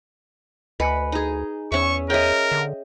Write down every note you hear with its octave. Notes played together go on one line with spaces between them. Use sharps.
D2 B4 D#5 G#5 C#7
D#4 G#4
E2 C#4 E5 C#6
G#4 A#4 C#5 D#5 E5 G5
D3